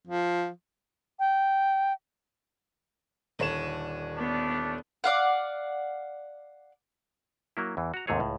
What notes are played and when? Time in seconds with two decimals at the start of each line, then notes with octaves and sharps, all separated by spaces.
0.07 F3
1.19 G5
3.39 D#1 D3 C#5 E7
4.17 A3 B3 D4
5.04 D5 F5 F#5
7.57 F#3 A#3 E4
7.77 E2 E3
7.94 F#4 A#5
8.07 D#2 G#2 C3 A3 G#4 C#5
8.20 C#2 A2